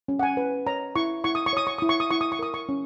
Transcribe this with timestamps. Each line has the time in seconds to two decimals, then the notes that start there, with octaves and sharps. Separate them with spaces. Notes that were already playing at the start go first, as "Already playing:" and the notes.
0.08 C#4
0.19 F#5
0.23 G#5
0.37 B4
0.67 C#5 A#5
0.96 E4 C#6
1.24 E4 C#6
1.35 D#6
1.46 C#6
1.53 C#5 D#6
1.67 C#6
1.79 E4 D#6
1.89 C#6
2.00 D#6
2.11 E4 C#6
2.21 D#6
2.32 C#6
2.39 A#4 D#6
2.54 C#6
2.69 C#4